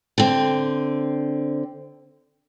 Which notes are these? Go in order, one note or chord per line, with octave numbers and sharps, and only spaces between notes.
D3 C4